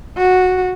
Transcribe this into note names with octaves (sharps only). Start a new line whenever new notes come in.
F#4